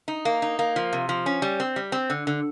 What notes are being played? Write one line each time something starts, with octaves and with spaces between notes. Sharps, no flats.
D#4
A#3
D#4
A#3
F3
C3
F3
C#4
G3
C4
G3
C4
D3
D3